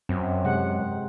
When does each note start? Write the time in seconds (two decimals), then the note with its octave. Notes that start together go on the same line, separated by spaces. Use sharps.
0.09 F#2 C4
0.44 C3 G#3 F#5